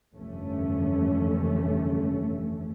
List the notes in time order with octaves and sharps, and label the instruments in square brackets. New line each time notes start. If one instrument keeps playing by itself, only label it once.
[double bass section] F1 G2 D3 E3 A3 C#4